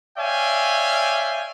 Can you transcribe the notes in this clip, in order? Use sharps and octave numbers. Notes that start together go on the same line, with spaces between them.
C#5 D5 E5 F5 G5 G#5